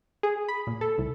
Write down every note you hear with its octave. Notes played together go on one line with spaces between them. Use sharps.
G#4
B5
A#2
A4
C2